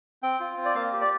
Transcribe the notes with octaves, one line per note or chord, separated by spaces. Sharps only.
C4 G5
F4
C4
D5
A#3 F5
G4
D5